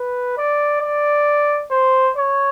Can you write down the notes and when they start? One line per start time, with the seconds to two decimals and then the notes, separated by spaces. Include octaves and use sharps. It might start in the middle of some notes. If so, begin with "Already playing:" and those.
Already playing: B4
0.37 D5
0.81 D5
1.71 C5
2.17 C#5